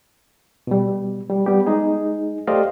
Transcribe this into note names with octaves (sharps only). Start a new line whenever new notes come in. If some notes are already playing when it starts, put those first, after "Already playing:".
B2 G3
G3
G3 B3 G4
G#3 D#4 G#4
A3 G4 C5 D5 D#5 F5